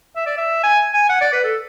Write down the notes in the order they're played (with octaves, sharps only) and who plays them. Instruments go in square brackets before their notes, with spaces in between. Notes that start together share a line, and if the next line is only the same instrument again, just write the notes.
[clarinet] E5
D5
E5
G#5
G#5
F#5
D5
B4
A4